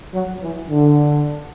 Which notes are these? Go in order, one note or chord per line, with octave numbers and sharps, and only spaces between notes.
F#3
E3
D3